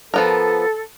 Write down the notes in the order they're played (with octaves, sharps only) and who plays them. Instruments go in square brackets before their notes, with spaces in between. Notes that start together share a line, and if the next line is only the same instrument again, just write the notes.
[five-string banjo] F3 B3 A#4 [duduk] A4